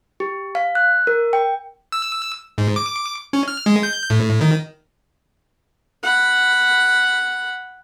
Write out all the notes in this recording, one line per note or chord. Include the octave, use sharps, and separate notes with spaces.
G4
F5
F#6
A#4
G5
E6
G#2
D6
C#4
F6
G#3
G6
A2
D#3
F#5 B5